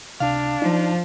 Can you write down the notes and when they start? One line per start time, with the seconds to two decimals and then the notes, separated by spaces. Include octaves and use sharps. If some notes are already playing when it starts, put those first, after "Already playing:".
0.20 C#2 C3 D4 F5
0.62 F3 D#4 D5